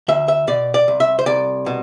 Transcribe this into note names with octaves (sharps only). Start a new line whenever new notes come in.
D2 E5
E5
B2 D5
D5
C2
E5
C5
C2 D5
B2